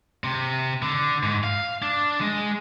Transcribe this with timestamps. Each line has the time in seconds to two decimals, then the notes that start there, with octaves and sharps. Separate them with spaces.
0.24 C3
0.82 D3
1.23 G#2
1.44 F5
1.82 D4
2.21 G#3